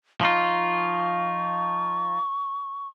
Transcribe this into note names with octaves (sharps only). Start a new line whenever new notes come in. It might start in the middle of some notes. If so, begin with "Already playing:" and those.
F3 D#4 F4 C#6